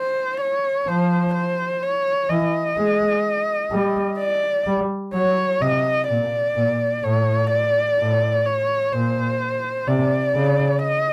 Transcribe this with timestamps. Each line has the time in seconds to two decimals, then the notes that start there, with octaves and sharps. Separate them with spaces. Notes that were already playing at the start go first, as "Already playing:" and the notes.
Already playing: C5
0.41 C#5
0.87 F3 C5
1.34 C5
1.82 C#5
2.29 E3 D#5
2.78 G#3
3.72 G3
4.19 D5
4.67 G3
5.14 F#3 C#5
5.61 C3 D#5
6.08 A#2 D5
6.56 A#2
7.03 A2 C#5
7.50 D5
7.98 A2
8.46 C#5
8.93 A#2 C5
9.87 C3 D5
10.35 C#3
10.82 D#5